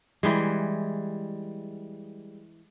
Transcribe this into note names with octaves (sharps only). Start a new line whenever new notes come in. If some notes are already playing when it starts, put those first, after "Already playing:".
E3 G3 G#3